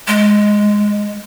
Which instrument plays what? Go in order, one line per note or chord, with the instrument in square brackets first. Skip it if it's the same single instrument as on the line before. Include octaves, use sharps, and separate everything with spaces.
[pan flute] G#3